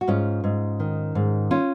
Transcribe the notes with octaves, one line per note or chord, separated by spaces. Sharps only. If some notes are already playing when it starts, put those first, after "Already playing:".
F#4
G#2 C#4 F4
G#2
D#3
G#2
C#4 F4